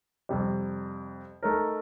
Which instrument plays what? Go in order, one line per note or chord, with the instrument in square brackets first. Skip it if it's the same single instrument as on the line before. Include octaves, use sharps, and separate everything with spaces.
[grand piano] F2 C3 G3
A3 D#4 A#4